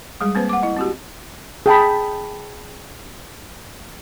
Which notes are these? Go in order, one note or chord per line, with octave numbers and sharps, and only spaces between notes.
G3 G#3 G#4
A#3 C4 B4 C5
F#5 D6
E4 D#5
C4 F#4 G4
G#4 G5 A5 B5